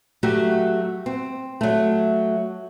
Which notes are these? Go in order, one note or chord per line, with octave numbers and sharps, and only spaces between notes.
F#3 A3 F#4 G4
C4
F#3 A3